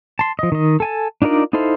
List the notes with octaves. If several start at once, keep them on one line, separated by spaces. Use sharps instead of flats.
A5 C6
F3 D#5
D#3 D#5
A4 G#5 A5
D4 D#4 F4 A#4 D5
D#4 E4 A4 C5 F5